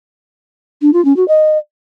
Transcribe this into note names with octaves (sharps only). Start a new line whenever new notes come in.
D4
F4
C#4
F#4
D#5